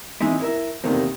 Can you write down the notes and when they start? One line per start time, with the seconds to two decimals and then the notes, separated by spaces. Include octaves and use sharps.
0.21 E3 G#3 C4 D#4 E4
0.40 E4 A#4 E5
0.84 E2 C3 D#3 A3 A#3 C4